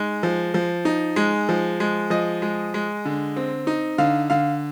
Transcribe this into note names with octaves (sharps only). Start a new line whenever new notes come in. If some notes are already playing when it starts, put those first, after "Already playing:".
Already playing: G#3 D#4
F3
F3
D#4
G#3
F3
G#3
F3 D#5
G#3
G#3
D3
C4
D#4
D3 F5
D3 F5